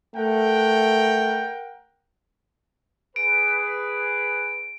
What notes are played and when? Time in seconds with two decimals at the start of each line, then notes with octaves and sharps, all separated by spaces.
0.15 A3 A#4 F#5 G5
3.16 G#4 B4 D7